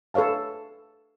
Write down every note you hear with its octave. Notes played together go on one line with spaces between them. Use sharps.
A4 B4 C#5 F5 A5